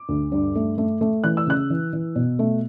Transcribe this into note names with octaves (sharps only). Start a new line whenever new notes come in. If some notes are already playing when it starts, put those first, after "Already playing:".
Already playing: D6
D2
G2
A3
A3
A3
E3 F#6
E6
C#3 F#6
E3
E3
B2
A3